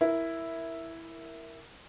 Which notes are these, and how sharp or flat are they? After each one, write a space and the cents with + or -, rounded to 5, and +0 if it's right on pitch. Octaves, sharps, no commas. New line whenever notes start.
E4 +0 A#4 +0